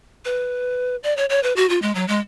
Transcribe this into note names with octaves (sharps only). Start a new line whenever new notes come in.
B4
D5
C#5
C#5
B4
F#4
F4
G#3
F#3
G#3